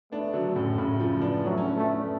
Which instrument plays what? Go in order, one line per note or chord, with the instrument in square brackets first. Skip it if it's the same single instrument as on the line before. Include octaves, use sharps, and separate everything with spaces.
[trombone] A3 [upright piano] B3 D4
[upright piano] D3 F#3
F#2 A2
A2 C#3
C#3 F3
B3 D4
[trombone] F#3 [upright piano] A3 C#4
[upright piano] C#4
B3 D4
[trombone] A3
[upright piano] B3 D4